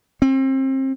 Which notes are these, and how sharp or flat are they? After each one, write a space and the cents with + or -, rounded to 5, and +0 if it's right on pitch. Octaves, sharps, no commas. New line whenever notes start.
C4 +30